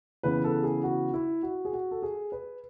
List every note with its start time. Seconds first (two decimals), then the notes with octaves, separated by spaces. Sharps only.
0.23 C#3 E3 B3 B4
0.44 A4
0.63 G#4
0.83 F#4
1.14 E4
1.43 F#4
1.65 G#4
1.73 F#4
1.91 A4
2.02 G#4
2.32 B4